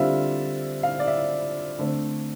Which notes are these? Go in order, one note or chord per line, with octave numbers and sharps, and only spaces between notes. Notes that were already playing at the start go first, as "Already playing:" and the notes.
Already playing: D3 G3 C4 F4 E5
F5
D5
E5
D3 A3 C4